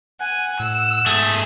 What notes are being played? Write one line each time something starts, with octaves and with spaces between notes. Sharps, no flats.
F#5 G#5
A2 E6
G#2 A3 G#4